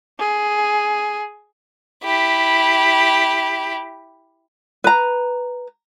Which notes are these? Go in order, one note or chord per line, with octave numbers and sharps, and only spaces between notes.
G#4
E4 G4
B4 A#5